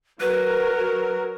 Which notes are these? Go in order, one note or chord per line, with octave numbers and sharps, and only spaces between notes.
F#3 A#4 B4